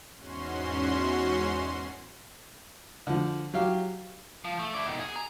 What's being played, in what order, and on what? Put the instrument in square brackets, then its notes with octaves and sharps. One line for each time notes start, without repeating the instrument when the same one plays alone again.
[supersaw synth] E2 G#2 C#4 F#4 C6
[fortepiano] D3 F3
F#3 G4 F5
[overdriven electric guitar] F3
A3
E4 D5
B2 D#3
G#4
A#5